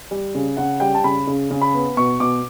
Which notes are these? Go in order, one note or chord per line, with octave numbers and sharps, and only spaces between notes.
G3
C#3
C#3 F#5
G3 G5
A5
C#3 B5
C#3
C#3
B5
B3
B2 C#6
B2 D6